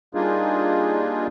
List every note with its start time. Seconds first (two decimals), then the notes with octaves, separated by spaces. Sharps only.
0.15 G3 A#3 D4 D#4 F4 G#4